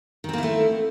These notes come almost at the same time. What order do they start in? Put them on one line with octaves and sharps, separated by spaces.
D#3 C4 A#3 E4 A3